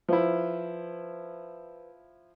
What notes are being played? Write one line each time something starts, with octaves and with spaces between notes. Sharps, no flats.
F3 E4 B4 C5 E5